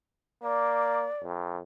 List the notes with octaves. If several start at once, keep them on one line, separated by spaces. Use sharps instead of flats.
A#3 D5
F2